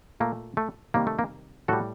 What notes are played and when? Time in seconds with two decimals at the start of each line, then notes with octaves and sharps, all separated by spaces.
0.20 A#2 A3 A#3
0.57 A3
0.94 C3 D#3 G3 A#3
1.07 A3
1.19 A#3
1.68 A2 G3 F#4 A4